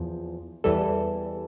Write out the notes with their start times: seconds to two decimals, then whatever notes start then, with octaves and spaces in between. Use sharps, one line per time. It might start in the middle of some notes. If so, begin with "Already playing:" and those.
Already playing: E2 F3
0.64 E2 E3 G3 A4